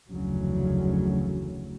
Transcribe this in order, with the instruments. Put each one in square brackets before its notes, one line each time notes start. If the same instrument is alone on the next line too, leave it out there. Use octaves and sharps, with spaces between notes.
[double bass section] F1 D2 C#3 E3 F#3